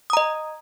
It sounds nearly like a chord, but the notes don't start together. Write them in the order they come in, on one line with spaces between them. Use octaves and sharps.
D#6 A#5 D#5